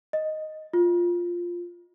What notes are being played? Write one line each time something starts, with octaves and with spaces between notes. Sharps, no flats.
D#5
F4